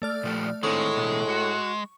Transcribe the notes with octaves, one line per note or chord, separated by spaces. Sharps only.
A3 D5 F6
A#2 F3 G4
A2 D#3 G#3 C4 D4 C#6
B2 D3 E3
F#4